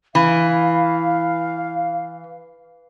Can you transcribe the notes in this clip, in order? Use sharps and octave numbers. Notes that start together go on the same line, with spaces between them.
E3 F5